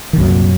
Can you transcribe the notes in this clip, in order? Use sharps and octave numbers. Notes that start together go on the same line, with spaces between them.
D#3
C2 F#2 A#2 F#3